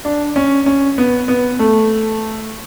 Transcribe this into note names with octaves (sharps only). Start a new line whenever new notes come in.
D4
C#4
C#4
B3
B3
A3